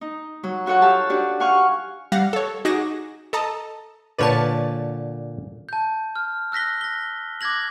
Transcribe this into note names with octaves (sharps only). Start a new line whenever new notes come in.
D#4
F#3
F4 F#4 A4 C#5 F#5
G4 F5 A5 E6
D4 F#4 G4
F5 F#5 G#5 C#6 F6
G3 F5 F#5 A#6
A4 C#5
D#4 F#4 G#4 D6 A#6 E7
A4 D#5 A5 A#5
A#2 D3 B4 C#5 D5 A5
A5 G6
F6
E6 F#6 A#6 B6 G7
A#6 G7
D6 F#6 G#6 A#6 F#7